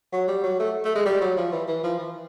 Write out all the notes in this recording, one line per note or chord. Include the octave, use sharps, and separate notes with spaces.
F#3
G3
F#3
A3
A3
G#3
G3
F#3
F3
E3
E3
F3
E3